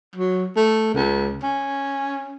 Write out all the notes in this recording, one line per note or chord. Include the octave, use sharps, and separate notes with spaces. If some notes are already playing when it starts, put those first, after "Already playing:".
F#3
A3
C#2
C#4